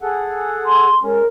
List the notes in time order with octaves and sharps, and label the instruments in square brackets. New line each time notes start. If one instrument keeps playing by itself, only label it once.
[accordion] G#4 A4 F#5
[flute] C6
[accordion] G#3 C#4 [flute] A#4